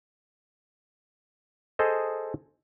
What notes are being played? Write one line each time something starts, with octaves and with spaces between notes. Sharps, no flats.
G#4 A4 C5 D#5